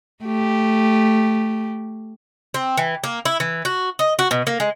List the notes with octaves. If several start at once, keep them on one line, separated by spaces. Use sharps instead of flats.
A3 G4
C4
E3
A#3
E4
E3
F#4
D#5
F#4
B2
A#3
G#3